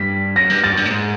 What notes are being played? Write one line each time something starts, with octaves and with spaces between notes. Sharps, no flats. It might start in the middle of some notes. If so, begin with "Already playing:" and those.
Already playing: G2 B6
F#2 A#6
G2
G2 A6
F#2
G2
A2
G#2